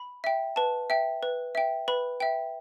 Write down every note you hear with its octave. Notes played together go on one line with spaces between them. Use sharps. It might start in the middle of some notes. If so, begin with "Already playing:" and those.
Already playing: B5
E5 G5
B4 A5
E5 G5
B4
E5 G5
B4 B5
E5 G5